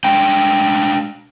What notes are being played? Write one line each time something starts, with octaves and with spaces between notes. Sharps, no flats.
G#3 D4 G5